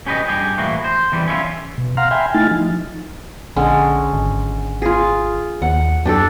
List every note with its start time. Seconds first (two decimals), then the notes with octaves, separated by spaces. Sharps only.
0.06 C#4 G4 B4 C5 D#5
0.28 G2 G4 G#4
0.58 A2 E3 A#3 F#4
0.84 C5
1.12 E2 E3 G3
1.27 C#4 E4 F4 E5
1.78 B2
1.97 F5 F#5 A#5 C6 F6
2.11 E5 G5 G#5 B5 C6
2.34 A3 D#4 E4 G#5 F6 A6
2.51 F3 D#4
3.56 A#1 D3 G#3 C#4
4.13 G#1
4.82 F4 G#4
5.62 D#2 F#5
6.06 F#2 D4 G4 A4